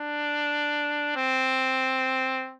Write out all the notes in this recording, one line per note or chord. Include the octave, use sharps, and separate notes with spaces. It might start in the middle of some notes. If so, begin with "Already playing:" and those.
Already playing: D4
C4